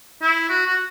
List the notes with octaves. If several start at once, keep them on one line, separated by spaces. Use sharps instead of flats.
E4
F#4
F#4